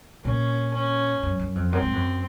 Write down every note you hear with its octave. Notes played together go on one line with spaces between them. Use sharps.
A#2 C#4
C#4
F#2
F#2
F2
F#2 C4
G#2
F#2